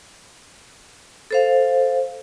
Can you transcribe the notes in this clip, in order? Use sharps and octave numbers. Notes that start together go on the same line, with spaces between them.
A4 C5 F5